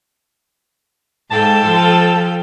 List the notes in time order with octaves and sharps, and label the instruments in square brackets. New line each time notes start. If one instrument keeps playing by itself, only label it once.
[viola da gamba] G#2 [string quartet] A4 F5 G5 [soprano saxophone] A5
[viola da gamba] F3